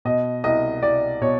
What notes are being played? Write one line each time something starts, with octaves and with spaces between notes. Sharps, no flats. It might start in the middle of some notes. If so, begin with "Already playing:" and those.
B2 D#5
C2 D#5
C2 D5
B2 C#5